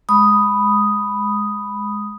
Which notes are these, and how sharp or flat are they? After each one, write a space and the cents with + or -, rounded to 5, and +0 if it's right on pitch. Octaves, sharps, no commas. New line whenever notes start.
G#3 +0 B5 +0 D#6 +0